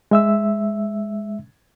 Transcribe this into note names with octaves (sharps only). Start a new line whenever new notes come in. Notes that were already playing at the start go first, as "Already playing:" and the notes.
G#3 E5 E6